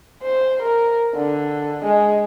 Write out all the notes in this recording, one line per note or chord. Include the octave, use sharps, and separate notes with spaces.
C5
A#4
D3
G#3